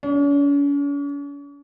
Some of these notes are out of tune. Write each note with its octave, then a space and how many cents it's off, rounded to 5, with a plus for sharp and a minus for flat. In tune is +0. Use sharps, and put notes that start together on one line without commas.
C#4 +45